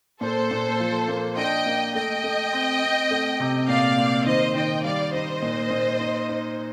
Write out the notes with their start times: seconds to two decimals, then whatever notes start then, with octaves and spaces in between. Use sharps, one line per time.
0.21 A#2 A4 C5
0.51 A#2
0.80 F3
1.08 A#3
1.37 D4 D#5 G5
1.66 A#3
1.94 A3 D#5 G5
2.24 A3
2.53 C4
2.82 C4
3.11 A3
3.40 C3
3.68 A#2 D5 F5
3.98 A#2
4.26 D#3 C5 D#5
4.55 D#3 D#5 G5
4.84 G3 D5 F5
5.13 D#4 C5 D#5
5.42 A#2
5.70 A#2
6.00 D#4
6.29 D#4